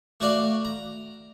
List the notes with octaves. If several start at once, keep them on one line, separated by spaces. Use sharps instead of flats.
A3 F#4 D5 F5
A#5